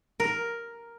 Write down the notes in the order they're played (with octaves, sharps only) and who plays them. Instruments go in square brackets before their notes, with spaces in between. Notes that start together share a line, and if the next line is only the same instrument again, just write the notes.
[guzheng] A#4